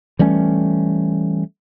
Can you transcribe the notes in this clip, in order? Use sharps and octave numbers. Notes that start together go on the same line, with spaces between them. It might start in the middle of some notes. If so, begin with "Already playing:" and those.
E3 G3 A3 C#4